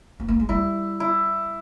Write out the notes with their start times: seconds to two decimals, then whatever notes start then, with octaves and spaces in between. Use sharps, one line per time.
0.20 C4
0.28 A#3
0.40 G#3
0.49 G3 E4
1.00 E4